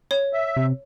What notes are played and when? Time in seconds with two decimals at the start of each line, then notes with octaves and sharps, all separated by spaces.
0.11 C#5
0.33 E5
0.56 C3